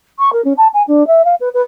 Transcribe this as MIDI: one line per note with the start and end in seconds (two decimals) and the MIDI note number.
0.19 0.33 85
0.33 0.44 70
0.45 0.53 61
0.58 0.68 81
0.74 0.83 80
0.88 1.07 62
1.07 1.25 76
1.25 1.35 77
1.40 1.49 71
1.54 1.62 71